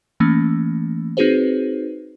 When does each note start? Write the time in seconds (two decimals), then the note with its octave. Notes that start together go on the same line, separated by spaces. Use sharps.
0.20 E3 A3 A#3 C#4
1.17 C4 D#4 F#4 G#4 B4 C5